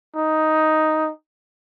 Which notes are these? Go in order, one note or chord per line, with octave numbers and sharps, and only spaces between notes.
D#4